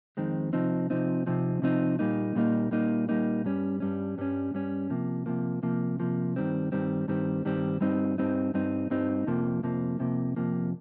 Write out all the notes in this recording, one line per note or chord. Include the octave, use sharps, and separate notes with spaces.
F2 D#3 G#3 C4
C3 F3 C4 D#4
C3 F3 C4 D#4
C3 F3 C4 D#4
C3 F3 C4 D#4
A#2 G3 A#3 D#4
A#2 G3 A#3 D#4
A#2 G3 A#3 D#4
A#2 G3 A#3 D#4
G2 G3 C#4
G2 G3 C#4
G2 G3 C#4
G2 G3 C#4
C3 F3 A#3
C3 F3 A#3
C3 F3 A#3
C3 F3 A#3
G2 D#3 G3 C4
G2 D#3 G3 C4
G2 D#3 G3 C4
G2 D#3 G3 C4
G2 G3 C4 D#4
G2 G3 C4 D#4
G2 G3 C4 D#4
G2 G3 C4 D#4
F2 C3 F3 A#3
F2 C3 F3 A#3
F2 C3 F3 A#3
F2 C3 F3 A#3